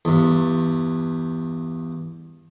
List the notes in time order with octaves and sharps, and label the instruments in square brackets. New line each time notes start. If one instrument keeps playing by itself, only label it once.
[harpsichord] E2 G2